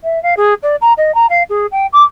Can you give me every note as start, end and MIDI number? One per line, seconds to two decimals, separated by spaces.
0.03 0.21 76
0.22 0.34 77
0.36 0.54 68
0.62 0.76 74
0.81 0.93 82
0.97 1.14 75
1.14 1.26 82
1.29 1.43 77
1.49 1.66 68
1.71 1.86 79
1.92 2.03 86